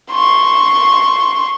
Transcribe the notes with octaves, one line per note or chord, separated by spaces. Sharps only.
C6 C#6